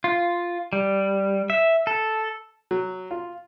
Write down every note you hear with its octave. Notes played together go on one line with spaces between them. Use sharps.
F4
G3
E5
A4
F#3
F4